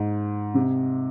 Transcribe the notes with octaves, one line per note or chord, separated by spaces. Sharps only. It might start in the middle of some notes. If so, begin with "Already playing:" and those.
Already playing: G#2
C3